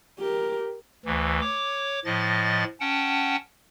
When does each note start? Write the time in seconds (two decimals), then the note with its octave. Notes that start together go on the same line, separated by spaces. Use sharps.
0.19 G4 A#4
1.05 D2 E3
1.41 C#5 D6
2.05 A2 F3 D#5 A6
2.81 C#4 F#5 G5 A5